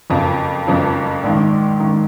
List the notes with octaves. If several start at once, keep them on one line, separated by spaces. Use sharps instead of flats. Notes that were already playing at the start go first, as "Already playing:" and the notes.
F#1 F2 C#3 F3
F#1 F2 C#3 F3
A#1 G#2 D#3
G#2 D#3